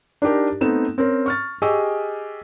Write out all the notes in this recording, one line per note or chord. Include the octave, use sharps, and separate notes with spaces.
D4 D#4 G4 A#4
A3 B3 C4 D#4 E7
C4 C#4 A#4
C#6 F6 A6
G4 G#4 D#5 C#6 E6